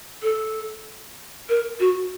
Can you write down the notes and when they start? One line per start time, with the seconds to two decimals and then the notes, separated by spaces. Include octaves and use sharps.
0.23 A4
1.49 A#4
1.80 F#4